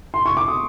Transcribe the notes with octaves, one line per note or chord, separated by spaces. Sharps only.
C6
C#6
D6
D#6